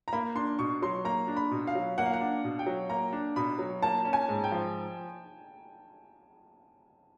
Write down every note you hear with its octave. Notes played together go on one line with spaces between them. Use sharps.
A#5
A#3 B5
D4 C6
B2 C#6
F#3 C6
A#3 A#5
D4
B5
B2
F5
F#3
A#3 F#5
F5
F#5
D4
B2
G5
F#3
A#3 A#5
D4
B2 B5
F#3
A#3 A5
C#4
G#5
G#2
G5
F3